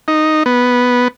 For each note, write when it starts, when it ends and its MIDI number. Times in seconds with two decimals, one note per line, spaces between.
0.08 0.43 63
0.46 1.08 59